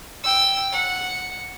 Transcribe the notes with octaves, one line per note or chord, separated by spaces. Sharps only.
G5 E6
F#5